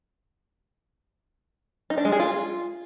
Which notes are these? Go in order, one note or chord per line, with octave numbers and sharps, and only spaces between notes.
D#4
D4
G#3
G#4
F4